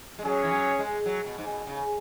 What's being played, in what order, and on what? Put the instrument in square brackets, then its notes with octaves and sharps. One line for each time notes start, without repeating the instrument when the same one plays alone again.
[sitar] G#3
[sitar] F#3 [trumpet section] C#4 G#4 C#5
[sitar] E3
F#3
G#3
F#3
B2
G#2
B2
C#3